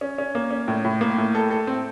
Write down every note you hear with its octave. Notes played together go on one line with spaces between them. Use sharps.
C#4
C#4
A#3
C#4
A2
A2
A#3
A2
A4
A4
C4